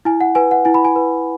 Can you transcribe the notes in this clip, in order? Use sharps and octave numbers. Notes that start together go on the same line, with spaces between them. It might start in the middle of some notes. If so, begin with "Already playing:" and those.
E4 G#5
F#5
B4 G#5
F#5
E4 G#5
B5
G#5
B4